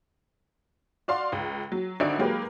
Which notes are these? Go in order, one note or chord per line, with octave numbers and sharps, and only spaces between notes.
F#4 D5 F5 C6
C#2
F#3
G#1 D3 F#4 E5 D7
F#3 G#3 A#3 G4 A#4 B4